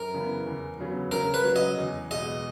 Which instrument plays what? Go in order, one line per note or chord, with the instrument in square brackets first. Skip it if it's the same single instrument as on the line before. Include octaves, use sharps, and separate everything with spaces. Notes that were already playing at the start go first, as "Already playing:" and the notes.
Already playing: [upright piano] F#2 [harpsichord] A#4
[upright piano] C#3 E3 B3
E2
C#3 F#3 B3
[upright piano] C#3 [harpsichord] A#4
[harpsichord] B4
[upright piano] F#3 C#4
[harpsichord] D#5
[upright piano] E2
[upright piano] B2 G#3 [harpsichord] D#5